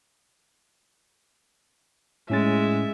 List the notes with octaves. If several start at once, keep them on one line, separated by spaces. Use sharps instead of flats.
A2 G#3 C#4 E5 A6